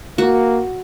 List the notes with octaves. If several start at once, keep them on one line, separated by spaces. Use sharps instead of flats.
A#3 F#4